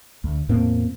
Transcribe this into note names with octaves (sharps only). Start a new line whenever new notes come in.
D2
E2 A2 A#3 C4